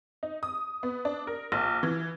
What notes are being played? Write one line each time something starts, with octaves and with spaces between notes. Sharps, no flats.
D#4
D#6
B3
D4
A#4
A#1
E3